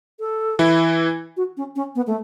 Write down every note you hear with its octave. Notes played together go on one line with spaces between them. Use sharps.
A4
E3 E4
F#4
C#4
C#4
B3
A3